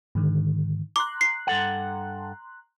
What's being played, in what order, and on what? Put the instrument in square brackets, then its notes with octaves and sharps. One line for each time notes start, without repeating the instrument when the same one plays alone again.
[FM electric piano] G#2 D3 D#3
[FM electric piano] A#5 C6 F#6 [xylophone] D6
[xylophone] C7
[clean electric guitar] G2 A4 F#5